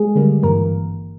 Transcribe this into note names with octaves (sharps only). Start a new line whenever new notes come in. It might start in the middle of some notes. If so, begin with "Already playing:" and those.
Already playing: G#3 G#4
D#2 D3 G3 A#3
G#1 G2 E3 A#3 A#4